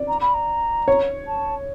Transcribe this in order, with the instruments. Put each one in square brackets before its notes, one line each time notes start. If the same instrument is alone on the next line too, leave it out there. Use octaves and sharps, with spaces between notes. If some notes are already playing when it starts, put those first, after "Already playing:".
Already playing: [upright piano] D5
[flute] A#5
B5
A#5
[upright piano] C#5
[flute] A5